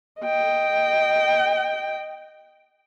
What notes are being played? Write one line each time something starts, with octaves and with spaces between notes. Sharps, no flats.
D#5 G5